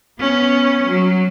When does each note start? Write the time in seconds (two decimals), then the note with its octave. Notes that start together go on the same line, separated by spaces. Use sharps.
0.20 B3 C#4
0.88 F#3